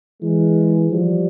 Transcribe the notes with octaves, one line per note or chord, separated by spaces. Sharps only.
E3 G#3
F3 G3